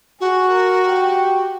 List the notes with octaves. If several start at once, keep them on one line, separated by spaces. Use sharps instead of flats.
F#4 G#4
A#4
G4